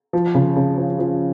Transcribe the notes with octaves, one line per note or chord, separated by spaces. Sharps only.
F3
C#3
C#3
F3
F3